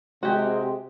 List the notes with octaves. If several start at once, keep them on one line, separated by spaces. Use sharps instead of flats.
C3 G#3 F#4 G4